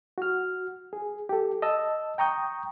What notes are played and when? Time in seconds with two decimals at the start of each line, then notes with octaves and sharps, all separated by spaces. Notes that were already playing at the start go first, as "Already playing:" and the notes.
0.18 F#4 F6
0.93 G#4
1.29 G4 A4
1.62 D#5 A5 E6
2.18 G5 A#5 C#6 D#6 G6